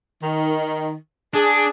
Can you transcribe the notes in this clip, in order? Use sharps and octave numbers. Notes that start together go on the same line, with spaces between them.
D#3
D4 G#4